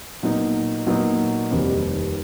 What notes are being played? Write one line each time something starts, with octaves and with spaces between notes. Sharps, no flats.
A#2 F#3 B3 D#4
A#2 F#3 B3 D#4
F1 D#2 D#3 G3 C4